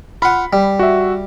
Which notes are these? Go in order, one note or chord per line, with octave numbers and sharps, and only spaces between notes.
F4 F#5 B5
G3
F#4 E5